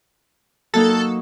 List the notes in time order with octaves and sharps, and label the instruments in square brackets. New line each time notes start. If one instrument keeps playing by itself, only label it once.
[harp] F#3 A#3 D#4 [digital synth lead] A4